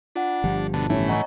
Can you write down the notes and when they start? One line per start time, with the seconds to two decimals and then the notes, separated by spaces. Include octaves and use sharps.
0.16 D4 F4 F#5
0.44 G1 F3 G4
0.74 B2 D3 A5
0.90 A2 E3 C#4 E4 G4
1.08 C#5 D#5 F#5 G#5 A#5 C#6